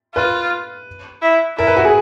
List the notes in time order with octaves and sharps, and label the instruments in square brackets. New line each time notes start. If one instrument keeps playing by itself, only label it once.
[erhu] F4 [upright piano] B4
[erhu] E4
[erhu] E4 [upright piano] A#4
[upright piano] B4
F#4
G#4